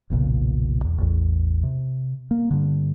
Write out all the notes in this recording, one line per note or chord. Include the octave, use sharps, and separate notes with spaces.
F1 B1 A#2 C#3
E2
A1 E2
C3
A#3
G2 D3